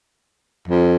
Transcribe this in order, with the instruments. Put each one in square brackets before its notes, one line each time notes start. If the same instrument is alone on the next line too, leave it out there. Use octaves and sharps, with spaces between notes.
[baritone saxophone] F2